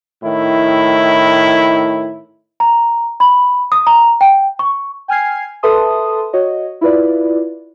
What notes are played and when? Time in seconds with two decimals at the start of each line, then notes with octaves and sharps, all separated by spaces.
0.23 A2 D#3 E4
2.60 A#5
3.20 B5
3.72 D#6
3.87 A#5
4.21 G5
4.59 C#6
5.08 G5 G#5 F6 G#6 C7
5.63 A4 B4 E5 A5 C6 D#6
6.33 F#4 C#5 D#5
6.81 E4 F4 B4 D5